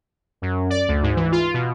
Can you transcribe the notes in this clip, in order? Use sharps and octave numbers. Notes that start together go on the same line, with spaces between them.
F#2
D5
D2
G#2
E3
F4
B2